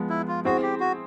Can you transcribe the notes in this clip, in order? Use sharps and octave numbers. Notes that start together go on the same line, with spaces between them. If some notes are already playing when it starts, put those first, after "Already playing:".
Already playing: F3 G#3 B3
E4
F4
C4 E4 F#4 G#4 C5
G4
F#4